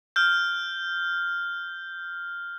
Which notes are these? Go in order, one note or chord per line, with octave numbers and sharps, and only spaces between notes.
F6 G6